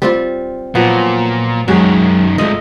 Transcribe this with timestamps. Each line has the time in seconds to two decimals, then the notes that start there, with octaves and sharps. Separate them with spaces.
0.02 G3 C4 F4
0.75 A#2 F3 F#3 B3
1.68 F#2 D#3 F#3 G#3 F#4 G#4
2.38 C2 G#2 A3 F4 D#5